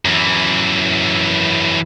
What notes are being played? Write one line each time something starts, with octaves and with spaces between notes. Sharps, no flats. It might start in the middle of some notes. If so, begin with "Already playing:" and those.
F#2 E3